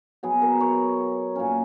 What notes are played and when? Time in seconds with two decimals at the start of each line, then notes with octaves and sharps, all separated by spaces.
0.23 B2 F#3 B3 G#4
0.42 A#4
0.60 C#5
1.36 A#2 A#3 C#4